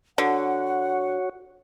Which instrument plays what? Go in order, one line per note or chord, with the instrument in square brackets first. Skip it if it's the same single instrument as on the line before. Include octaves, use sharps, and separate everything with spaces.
[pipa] D3 [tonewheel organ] F#4 C#5 [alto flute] F#5